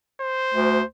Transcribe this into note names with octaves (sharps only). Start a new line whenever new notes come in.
C5
D2